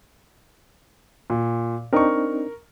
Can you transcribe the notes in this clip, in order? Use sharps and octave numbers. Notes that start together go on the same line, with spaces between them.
A#2
C4 D4 D#4 A#4 C#6